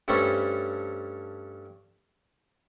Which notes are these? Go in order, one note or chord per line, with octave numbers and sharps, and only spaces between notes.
G2 A3 C#4 A4 C5 B5